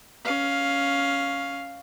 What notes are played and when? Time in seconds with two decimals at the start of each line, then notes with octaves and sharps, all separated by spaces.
0.25 C#4 F5